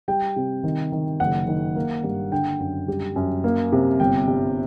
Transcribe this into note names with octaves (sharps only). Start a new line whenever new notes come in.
G3 G5
C3
D#3
D#3
F#1 F#5
D#3
A#3
G2
D3 G5
F#2
G3
F#2
A#3
C3
G1 G5
G2